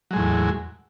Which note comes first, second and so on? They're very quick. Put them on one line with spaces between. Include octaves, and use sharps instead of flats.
F#3 G#3 A2 E2